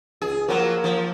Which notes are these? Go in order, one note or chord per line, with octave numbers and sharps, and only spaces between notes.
C#2 G#4
F3 F#3 A#3
F3